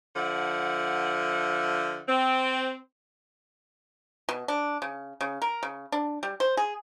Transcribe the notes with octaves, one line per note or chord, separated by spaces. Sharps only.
D3 F3 E5 F#5
C4
B2
D4
C#3
C#3
A#4
C#3
D4
G3
C5
G#4